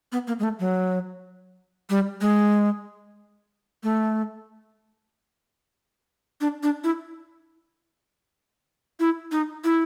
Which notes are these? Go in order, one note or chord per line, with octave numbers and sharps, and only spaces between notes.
B3
A#3
G#3
A3
F#3
G3
G#3
A3
D4
D4
E4
E4
D#4
E4